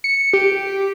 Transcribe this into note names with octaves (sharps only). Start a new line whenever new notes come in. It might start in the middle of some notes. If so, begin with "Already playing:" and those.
C#7
G4